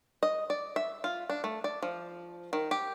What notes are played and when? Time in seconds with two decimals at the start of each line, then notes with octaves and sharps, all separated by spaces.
0.23 D#5
0.50 D5
0.76 E5
1.04 F4
1.30 D4
1.44 A3
1.64 D5
1.83 F3
2.53 D#3
2.71 G4